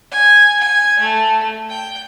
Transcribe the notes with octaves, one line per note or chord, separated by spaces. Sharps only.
G#5
G#5
A3
G5